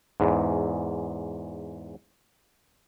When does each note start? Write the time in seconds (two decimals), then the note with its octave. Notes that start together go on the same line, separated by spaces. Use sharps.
0.20 E2 G#2